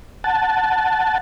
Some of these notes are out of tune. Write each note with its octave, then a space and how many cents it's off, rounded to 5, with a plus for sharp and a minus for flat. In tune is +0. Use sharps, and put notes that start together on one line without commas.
F#5 +0 A5 +0